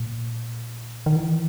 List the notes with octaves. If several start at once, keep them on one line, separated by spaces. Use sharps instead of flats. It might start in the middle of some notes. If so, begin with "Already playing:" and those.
Already playing: A#2
D#3
E3